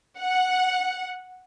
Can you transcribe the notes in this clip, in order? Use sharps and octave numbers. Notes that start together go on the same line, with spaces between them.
F#5